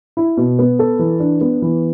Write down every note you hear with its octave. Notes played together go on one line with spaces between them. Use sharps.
E4
B2
B3
A4
E3
D4
B3
E3